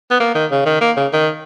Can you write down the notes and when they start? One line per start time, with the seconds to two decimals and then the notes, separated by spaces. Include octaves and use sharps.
0.11 B3
0.20 A#3
0.35 D#3
0.51 C#3
0.66 D#3
0.81 A#3
0.97 C#3
1.13 D#3